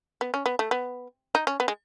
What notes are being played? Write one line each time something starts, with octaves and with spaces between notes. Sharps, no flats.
B3
C#4
B3
A3
B3
D#4
C#4
B3
G#3